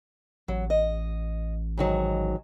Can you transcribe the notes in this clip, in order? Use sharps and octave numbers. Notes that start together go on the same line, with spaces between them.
A1 F#3
D#5
G#2 D#3 F#3